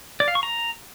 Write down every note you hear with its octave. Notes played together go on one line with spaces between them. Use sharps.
D5
F5
C#6
A#5